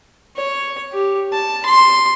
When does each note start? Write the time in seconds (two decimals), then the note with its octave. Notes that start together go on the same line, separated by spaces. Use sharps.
0.36 C#5
0.92 G4
1.32 A5
1.66 C6